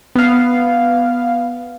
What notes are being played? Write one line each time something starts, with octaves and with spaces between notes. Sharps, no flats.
B3 F5